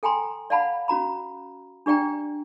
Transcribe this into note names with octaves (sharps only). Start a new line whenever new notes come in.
A4 G5 G#5 A#5 C6
D5 F5 F#5 A5 B5
C#4 F#4 A#5 B5
D4 G4 D5 G5 A#5